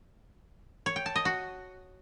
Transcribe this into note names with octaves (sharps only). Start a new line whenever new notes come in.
C#5
G5
A5
D#5
F#4